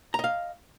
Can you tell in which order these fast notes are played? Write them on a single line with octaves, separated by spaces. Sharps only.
A#5 D#5 F5